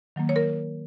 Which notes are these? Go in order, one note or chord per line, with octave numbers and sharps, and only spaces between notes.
D#3 F#3 A#3
C#5
A#4